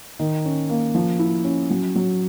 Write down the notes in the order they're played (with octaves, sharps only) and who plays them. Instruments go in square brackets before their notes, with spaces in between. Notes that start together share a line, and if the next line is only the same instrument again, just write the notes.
[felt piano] D#3
C#4
A#3
F3
E4
C#4
F#3
F#3